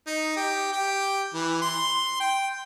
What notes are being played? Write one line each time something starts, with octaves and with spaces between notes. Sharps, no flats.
D#4
G4
G4
E3
C6
G5